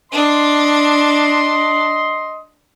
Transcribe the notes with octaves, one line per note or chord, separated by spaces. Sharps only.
D4 D#5 C6